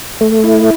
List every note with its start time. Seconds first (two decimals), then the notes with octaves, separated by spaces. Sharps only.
0.21 A3
0.44 E4